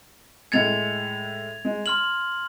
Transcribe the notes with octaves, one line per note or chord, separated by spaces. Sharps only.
A2 G#3 G#6 A6 C#7 F7
G#3
C6 F6 F7 F#7